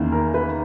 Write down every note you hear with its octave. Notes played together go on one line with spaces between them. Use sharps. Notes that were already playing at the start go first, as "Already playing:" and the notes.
Already playing: E2 D#3 A#3 C#4
A#4
B4